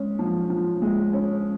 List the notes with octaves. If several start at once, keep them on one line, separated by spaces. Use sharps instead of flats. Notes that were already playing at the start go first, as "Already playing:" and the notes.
Already playing: G#3 C#4
F3
F3
G#3
C#4